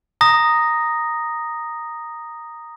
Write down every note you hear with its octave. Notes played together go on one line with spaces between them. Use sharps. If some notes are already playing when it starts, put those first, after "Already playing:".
A#5 D#6 A#6